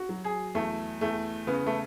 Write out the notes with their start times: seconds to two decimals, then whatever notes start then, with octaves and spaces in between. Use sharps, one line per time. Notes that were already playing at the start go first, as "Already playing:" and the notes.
Already playing: F#4
0.09 F#3
0.25 G#4
0.55 E2 A3
1.01 E2 A3
1.47 C#3 B3
1.66 A3